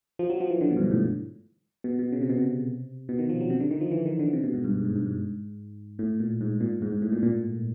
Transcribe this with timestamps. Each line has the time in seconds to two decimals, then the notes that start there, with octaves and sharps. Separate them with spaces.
0.19 F3
0.30 F#3
0.40 F3
0.50 E3
0.61 D3
0.71 B2
0.77 G2
0.81 G#2
0.91 A2
1.84 B2
1.99 B2
2.12 C#3
2.21 C3
2.29 B2
2.38 C3
3.09 B2
3.19 D#3
3.29 F3
3.41 F#3
3.50 C3
3.60 D3
3.71 D#3
3.81 F3
3.91 E3
4.06 D#3
4.19 D3
4.33 C3
4.43 B2
4.54 G#2
4.64 G2
4.75 G#2
4.85 G#2
4.96 G2
5.06 G#2
5.99 A2
6.20 A#2
6.41 G#2
6.60 A#2
6.82 G#2
6.92 G#2
7.02 A2
7.12 A#2
7.23 A#2